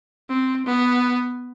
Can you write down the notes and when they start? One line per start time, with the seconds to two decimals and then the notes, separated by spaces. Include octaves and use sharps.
0.30 C4
0.66 B3